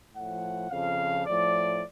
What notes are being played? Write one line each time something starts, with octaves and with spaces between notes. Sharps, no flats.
A2 F3 F#5
F2 C#3 F3 F5
A2 F3 D5